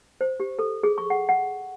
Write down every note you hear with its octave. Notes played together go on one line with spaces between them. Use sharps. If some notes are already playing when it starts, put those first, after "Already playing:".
C5
G4
A4
G#4
C#6
F#5
F#5